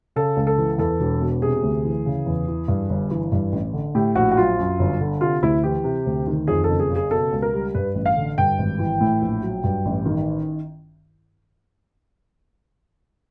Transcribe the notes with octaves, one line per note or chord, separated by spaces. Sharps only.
C#3 A4
C#2
A4
E3
E2 A4
E1
B2
C3 G#4
D2
E3
C#3
E2
E3
G2
G1
E3
G2
A1
D3
A2 G4
A#1 F#4
F#4
F#3 F4
F#2
G1
D3
C3 F4
D2 E4
E3 G4
C3
D2
D#3
F2 G#4
A4
F#1
G#4
C#3
G#4
B2 A4
C#2
A#4
G3
G2 B4
A1
F5
D3
G2 G5
G#1
E3
A2
A#1
F#3
G2
A1
D#3